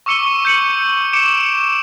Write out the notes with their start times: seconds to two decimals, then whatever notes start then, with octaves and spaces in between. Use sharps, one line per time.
0.06 C#6 D6 E6 C#7 D#7 G7
0.45 G6 C#7 F#7
1.13 D6 C#7 D7 E7